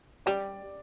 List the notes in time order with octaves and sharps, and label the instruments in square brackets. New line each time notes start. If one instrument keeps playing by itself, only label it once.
[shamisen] G3 [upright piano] D5